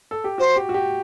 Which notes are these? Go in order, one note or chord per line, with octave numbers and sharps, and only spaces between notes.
A4
G4
F#4 C5
G4
F#4
G4